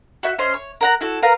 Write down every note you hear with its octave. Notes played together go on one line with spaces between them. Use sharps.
F#4 E5 G6
C#4 C5 D#5 C6
C#5
A#4 F#5 A#5
E4 F#4 A4
A#4 B4 F5 A#5